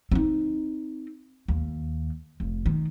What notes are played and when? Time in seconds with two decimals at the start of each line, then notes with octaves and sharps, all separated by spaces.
0.12 C4 D#4
1.48 D#2
2.40 F1
2.66 D#3